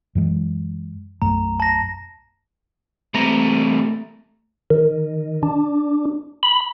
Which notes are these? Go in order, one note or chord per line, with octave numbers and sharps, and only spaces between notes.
F#2 E3 G#3
B1 F#2 A3 A#5
A5 A#6
C3 E3 A3 A#5
D#3
D4
B5